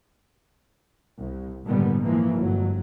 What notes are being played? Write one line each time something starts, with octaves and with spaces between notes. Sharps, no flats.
C2
A#1 G#2 D3 D#3 G3 B3
E3 F3 G#3 A#3
G1 F2 F#3